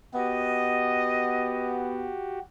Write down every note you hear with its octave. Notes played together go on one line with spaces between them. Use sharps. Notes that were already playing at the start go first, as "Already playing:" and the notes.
B3 F#4 G4 D#5